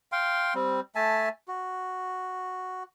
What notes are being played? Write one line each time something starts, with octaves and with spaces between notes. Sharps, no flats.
F5 G5 C6
G3 C4
A3 E5 G#5 A5
F#4